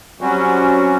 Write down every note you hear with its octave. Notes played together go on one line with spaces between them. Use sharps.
F#3 G3 C4 C#4 F#4